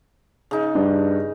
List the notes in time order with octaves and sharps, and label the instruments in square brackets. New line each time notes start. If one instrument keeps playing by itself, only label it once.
[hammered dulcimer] C#3 D#4
[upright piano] G2